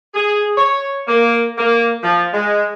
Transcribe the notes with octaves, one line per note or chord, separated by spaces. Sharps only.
G#4
C#5
A#3
A#3
F3
G#3